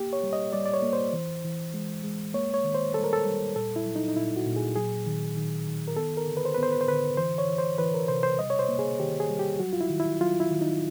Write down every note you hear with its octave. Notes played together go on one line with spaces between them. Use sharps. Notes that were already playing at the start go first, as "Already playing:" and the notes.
Already playing: A#3 G4
C#5
G3
D#5
G3 D5
D5
C#5
A#3
C5
E3
E3
G#3
G#3
A#3 C#5
C#5
D#3
C5
G3 A4
A#4
A4
G3
A#2 A4
E4
F#3
D#4
D#4
A#2 E4
F#4
A#2
G#4
F#3 G#4
D#3
D#3
D#3
A#4
B3 A4
A#4
D3
B4
C5
B3 B4
C5
B4
C5
D3 B4
E3 C5
C#5
E3
C5
E3 B4
A#4
C3 C5
C5
G3 D#5
C#5
C5
A#3
G#4
D#3 G4
G#4
G3
G4
F#3 F#4
F4
E4
D#3
E4
F#3 F4
E4
D#3
D#4